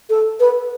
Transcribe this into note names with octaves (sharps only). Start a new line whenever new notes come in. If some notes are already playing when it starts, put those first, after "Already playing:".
A4
B4